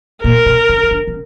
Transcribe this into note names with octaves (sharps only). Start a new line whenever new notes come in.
A#2 A#4
B2
C#3
E3
D3
C#3